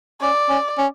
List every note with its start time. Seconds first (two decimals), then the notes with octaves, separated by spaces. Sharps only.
0.21 C#4 D5
0.49 C#4
0.78 C#4